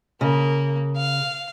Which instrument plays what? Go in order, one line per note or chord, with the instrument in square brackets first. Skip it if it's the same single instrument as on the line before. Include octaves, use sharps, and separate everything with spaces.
[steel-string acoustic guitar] C#3 [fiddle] A#3
[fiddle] F5